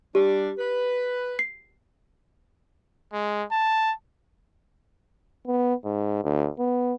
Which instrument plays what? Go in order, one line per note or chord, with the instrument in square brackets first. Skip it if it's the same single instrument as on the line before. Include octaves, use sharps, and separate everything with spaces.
[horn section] G3 D4 [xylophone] G4
[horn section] B4
[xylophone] C7
[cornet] G#3
A5
[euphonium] B3
G#2
D2
B3